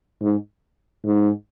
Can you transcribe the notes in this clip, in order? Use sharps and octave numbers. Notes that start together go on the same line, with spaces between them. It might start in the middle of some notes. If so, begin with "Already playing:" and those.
G#2
G#2